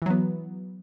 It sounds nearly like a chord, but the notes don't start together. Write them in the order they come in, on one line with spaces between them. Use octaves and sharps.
E3 F#3 B3